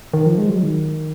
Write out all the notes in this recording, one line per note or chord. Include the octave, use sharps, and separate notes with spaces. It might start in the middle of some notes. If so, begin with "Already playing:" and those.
D#3
F3
G#3
F#3
D#3